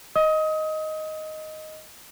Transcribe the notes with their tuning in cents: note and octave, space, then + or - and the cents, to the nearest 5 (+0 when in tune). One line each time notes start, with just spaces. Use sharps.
D#5 +0 D#6 +30